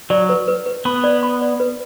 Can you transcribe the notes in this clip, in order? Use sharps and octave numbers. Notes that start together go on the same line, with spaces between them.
F#3 D5
B4
B4
B4
B3 B5
D5
B5
D5
B4